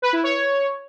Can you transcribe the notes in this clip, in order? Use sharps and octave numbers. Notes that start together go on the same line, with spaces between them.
B4
E4
C#5